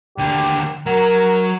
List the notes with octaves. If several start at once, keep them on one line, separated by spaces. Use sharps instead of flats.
D#2 D3 G4
F#3 A#4 F#5